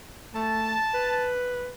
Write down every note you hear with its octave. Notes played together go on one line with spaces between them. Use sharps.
A3 A5
B4